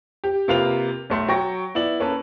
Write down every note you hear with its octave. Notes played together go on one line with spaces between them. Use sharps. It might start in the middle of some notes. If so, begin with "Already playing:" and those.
G4
C3 A#3 F4 B4 F7
B1 A3 C6
F#3 G5 C#6 A#6
B3 E4 D5 F#7
A#3 C#4 A4 B4